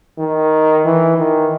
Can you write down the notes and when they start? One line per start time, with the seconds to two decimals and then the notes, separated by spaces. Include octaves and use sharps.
0.18 D#3
0.85 E3
1.18 D#3